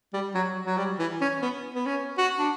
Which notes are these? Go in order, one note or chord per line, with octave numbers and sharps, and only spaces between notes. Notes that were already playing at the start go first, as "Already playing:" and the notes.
G3
F#3
F#3
G3
E3
C#4
B3
B3
C#4
F#4
D4